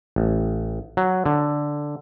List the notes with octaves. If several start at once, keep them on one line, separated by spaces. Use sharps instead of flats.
A1
F#3
D3